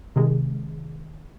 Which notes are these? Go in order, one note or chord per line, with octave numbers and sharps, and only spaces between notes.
C3 D#3 G#3